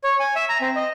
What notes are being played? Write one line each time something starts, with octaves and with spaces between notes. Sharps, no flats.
C#5
G#5
E5
A#5
C4
D#5